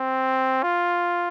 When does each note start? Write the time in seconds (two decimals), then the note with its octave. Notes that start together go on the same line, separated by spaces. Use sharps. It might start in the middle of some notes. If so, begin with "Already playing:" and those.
Already playing: C4
0.63 F4